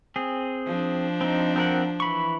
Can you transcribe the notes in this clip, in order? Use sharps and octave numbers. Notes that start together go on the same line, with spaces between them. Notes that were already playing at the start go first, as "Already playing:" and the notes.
C4 G#4
F3 D4
C4 D#4
C4 A#4 F#5
E3 B5 C#6